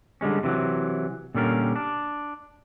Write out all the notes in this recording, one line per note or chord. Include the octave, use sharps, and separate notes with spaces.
D3 G3 G#3 C#4
C3 E3 F#3
A#2 D3 G3 C#4 A#4
D4